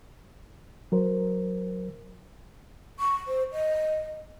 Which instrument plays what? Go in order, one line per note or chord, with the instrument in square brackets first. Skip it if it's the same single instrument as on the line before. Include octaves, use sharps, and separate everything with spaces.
[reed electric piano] F#3 A#4 C5
[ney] C#6
C5
D#5